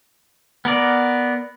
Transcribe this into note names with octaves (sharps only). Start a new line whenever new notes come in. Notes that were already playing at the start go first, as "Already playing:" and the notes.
B3 A#4 D5